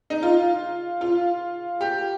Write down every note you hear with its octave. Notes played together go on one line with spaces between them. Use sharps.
D#4
F4
F4
G4